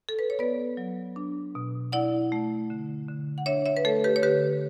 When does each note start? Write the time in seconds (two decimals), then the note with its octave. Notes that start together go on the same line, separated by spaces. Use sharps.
0.09 A4
0.19 B4
0.30 C#5
0.39 B3 B4 D5
0.77 F#3
1.16 D4
1.55 B2
1.92 E4 D5 F#5
2.32 A3
2.70 D3
3.08 D3
3.38 F#5
3.46 D4 C#5 E5
3.66 C#5 E5
3.77 B4
3.85 A3 A4 C#5
4.04 G4 B4
4.16 C#5
4.23 D3 G4 B4